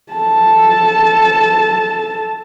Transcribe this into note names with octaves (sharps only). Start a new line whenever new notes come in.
A4 A5